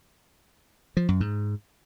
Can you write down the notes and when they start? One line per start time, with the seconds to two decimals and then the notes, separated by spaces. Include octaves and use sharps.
0.97 F3
1.09 F#2
1.20 G#2